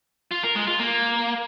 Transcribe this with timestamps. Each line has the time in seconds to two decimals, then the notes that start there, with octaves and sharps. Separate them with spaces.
0.31 F4
0.43 A#4
0.55 G#3
0.67 F4
0.79 A#3